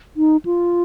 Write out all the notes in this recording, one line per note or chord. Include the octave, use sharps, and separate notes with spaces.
D#4
F4